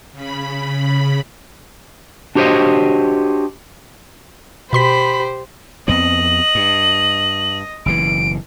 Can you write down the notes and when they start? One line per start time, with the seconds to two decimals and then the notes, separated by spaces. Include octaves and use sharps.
0.13 C#3 B5
2.35 D4 F#4 G4 C5 C#5 D#5
4.73 B2 G4 C5 B5 C6 B6
5.88 F2 B3 C4 D#5 F#7
6.55 G2
7.86 F#1 B2 E3 D7